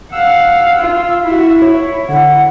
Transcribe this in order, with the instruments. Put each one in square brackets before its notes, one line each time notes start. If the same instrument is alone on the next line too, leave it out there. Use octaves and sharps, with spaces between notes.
[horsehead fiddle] F5 F#5 [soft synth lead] E6
[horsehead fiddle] F4
[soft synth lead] E4 [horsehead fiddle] F#4 E5
[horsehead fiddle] E4 [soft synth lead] C#5
[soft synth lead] D3 [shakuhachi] F#5